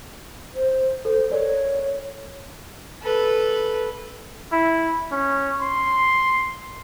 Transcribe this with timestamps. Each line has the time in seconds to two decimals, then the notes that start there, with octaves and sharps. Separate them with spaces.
0.55 C5
1.05 A4 C5
1.32 A#4 C#5 D5
3.02 A4 B4
4.52 E4
5.11 C#4
5.62 C6